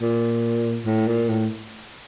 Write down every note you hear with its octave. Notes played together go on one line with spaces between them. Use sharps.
A#2
A2
A#2
A2